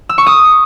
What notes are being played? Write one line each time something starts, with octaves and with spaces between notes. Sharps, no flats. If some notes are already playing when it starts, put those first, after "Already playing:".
E6
C#6
D#6